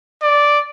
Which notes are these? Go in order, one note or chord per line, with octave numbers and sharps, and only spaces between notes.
D5